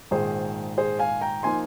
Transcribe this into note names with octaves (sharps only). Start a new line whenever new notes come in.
A#1 G#2 D#3 G#4 C5
G#4 C5
F5 G#5
G5 A#5
F3 A#3 D#4 G#5 C6